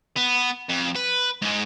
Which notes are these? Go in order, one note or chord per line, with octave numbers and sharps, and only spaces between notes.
B3
F2
B4
G#2 G#3